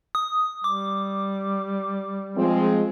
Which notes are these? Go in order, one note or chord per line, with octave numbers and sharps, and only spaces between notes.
D#6
G3 D6
F3 G#3 C4